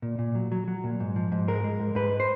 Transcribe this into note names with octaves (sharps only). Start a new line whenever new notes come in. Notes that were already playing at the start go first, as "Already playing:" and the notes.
A#2
A#2
F#3
F#3
F#3
A#2
G#2
F3
G#2
G#3 A#4
G#3
G#2
G#2 B4
C5